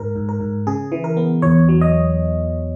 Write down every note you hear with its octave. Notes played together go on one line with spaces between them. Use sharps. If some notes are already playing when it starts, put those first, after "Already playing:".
Already playing: G#2 A#4
G#2
A#4
G#2
C#3 G#4
E3
A#4
B3
E2 C#5
F#3
D#5